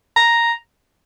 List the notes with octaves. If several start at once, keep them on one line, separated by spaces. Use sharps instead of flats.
A#5